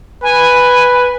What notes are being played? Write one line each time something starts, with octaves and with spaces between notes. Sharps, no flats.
B4 G#5